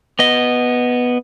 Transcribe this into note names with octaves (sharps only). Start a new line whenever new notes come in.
B3 D#5